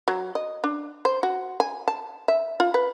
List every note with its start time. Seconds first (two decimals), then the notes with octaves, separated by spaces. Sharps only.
0.08 F#3
0.35 D#5
0.64 D4
1.05 C5
1.23 F#4
1.60 G#5
1.88 A5
2.28 E5
2.60 F4
2.74 B4